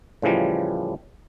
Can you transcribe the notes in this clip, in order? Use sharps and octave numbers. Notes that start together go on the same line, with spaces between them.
A2 C#3 E3 F3 G3